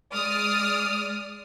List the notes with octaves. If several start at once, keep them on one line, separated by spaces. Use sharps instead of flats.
G#3 D5 D#6 F6